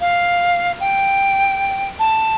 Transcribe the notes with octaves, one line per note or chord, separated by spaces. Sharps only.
F5
G5
A5